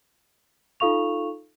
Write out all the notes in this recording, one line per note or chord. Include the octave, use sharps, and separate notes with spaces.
D#4 F4 A4 F5 C#6 F7